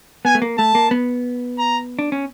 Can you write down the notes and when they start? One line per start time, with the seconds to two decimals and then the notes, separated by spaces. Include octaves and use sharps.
0.25 B3 G#5
0.35 A3
0.42 A#3
0.58 A3 A5
0.75 A#3
0.91 B3
1.58 A#5
1.99 D4
2.12 C#4